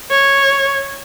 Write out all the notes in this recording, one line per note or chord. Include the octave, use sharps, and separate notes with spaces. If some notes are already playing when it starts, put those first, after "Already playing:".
C#5